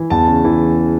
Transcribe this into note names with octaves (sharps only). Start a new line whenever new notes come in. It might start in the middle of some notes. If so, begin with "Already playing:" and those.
Already playing: E3
E2 A5
C#3
E3